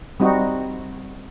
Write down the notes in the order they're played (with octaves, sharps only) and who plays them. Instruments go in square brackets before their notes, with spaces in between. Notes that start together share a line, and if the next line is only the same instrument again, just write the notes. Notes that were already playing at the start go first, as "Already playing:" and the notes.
[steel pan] G3 C4 D#4 F#4